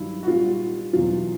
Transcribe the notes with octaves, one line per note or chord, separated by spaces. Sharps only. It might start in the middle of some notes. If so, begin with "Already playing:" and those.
Already playing: G2 D#3 F#3 E4
F#4
A#2 G3 F4
E2 B2 F#3 F4